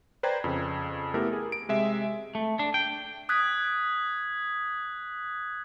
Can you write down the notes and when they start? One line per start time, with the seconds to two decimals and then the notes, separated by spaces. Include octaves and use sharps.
0.23 B4 C5 D5 G5 A#5 G#6
0.44 F2 C#3
1.14 A3 B3 E4 G4 A4 A#4
1.33 G#4
1.52 D7
1.69 C3 G#3 E5
2.35 A3
2.59 D4
2.74 G5
3.29 D#6 F#6 G#6 B6